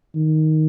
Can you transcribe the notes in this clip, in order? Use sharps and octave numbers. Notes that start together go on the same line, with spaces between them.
D#3